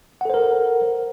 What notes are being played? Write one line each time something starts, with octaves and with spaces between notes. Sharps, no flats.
A4 A#4 C5 F#5